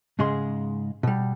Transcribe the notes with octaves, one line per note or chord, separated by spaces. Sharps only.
G#2 C#3 G#3 G#4 C6
B2 G3